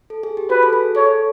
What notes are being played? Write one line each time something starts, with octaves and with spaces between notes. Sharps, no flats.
A4
G#4
G4
F#4 B4
A4
G#4
A4 C#5